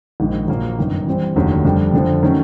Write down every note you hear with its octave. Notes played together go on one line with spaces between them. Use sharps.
A#1 G#2 D#3
A#1 A#2 F#3 A#3
G1 F#2 D#3
E3 G3 C4
F1 D#2 D3 F#3
F2 D3 G3
F2 D3 F3
D#3 F#3 A3 C#4